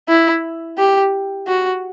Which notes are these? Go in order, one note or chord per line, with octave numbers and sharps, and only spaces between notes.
E4
G4
F#4